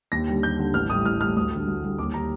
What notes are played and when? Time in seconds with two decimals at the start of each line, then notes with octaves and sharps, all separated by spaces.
0.12 D#2 A#6
0.28 D3 G3
0.43 D#2 G6
0.59 D3 G3
0.74 A1 F6
0.90 A2 G3 D#6
1.05 A1 F6
1.21 A2 G3 F6
1.36 D2 D#6
1.51 D3 G3
1.67 D2
1.82 D3 G3
1.98 D#2 D6
2.14 D#3 G3 A#5